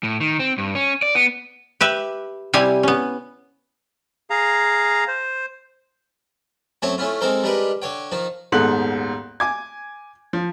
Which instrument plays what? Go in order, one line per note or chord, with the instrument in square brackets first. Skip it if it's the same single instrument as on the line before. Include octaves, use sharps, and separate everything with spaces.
[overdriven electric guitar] A2
D#3
C4
G2
C#4
D5
B3
[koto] G4 B4 E5
C3 G3 C4 E4 G4 G#5
B3 C#4
[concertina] G#4 F5 A#5
C5
[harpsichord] F#2 A3 C4 C5 C#5 A5
A3 C#4 E4 F4
G#3 C4 D#4 A4 A#4 C5
G3 G#3 D4 A#4 B4 D#5
D3 C#5 G5
D#3 F3 D#4
[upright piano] D#1 G#2 B3 A4 F#6 F#7
G#5 D6 G#6
F3